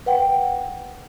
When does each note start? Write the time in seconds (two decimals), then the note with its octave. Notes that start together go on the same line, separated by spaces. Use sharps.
0.06 B4 F#5 G5